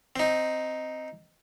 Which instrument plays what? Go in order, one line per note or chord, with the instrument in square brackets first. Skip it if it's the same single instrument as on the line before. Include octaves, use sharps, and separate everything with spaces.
[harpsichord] C4 D#4